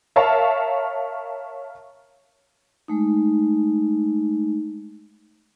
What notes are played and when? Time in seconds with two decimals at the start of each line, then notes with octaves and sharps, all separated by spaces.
0.16 A#4 C#5 E5 F5 A5
2.88 G#3 A3 D#4